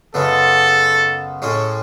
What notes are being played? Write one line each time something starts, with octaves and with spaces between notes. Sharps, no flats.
F#2 C#3 G#3 B3 A4
A2 G#3 C#4 A4